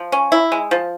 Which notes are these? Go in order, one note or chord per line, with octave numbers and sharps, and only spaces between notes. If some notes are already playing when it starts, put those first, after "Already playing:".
Already playing: F3
C#4
E4
G#3
F3